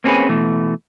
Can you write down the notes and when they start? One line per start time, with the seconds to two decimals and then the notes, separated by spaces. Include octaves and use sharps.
0.04 A#3 C4 C#4 G4 G#4 B4
0.29 B2 E3 A3